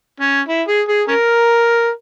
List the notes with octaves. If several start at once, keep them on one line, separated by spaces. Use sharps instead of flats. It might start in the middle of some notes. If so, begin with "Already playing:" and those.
C#4
E4
G#4
G#4
C#4 A#4